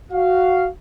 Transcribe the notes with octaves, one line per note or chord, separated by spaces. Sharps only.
F#4 F5